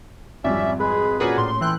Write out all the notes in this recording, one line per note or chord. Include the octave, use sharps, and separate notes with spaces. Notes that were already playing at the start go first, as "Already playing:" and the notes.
G#1 F2 G3 C#4 D5 E5
G#3 G#4 B4 B5
A#2 C#4 F#4 G#4 A#4 B4 D5
A2 C6
E3 A4 G5 F#6